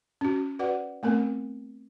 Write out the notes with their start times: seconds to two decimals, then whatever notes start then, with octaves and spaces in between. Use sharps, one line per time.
0.21 C#4 F#4
0.59 F#4 B4 D5 F#5
1.03 A3 B3 C4 A#4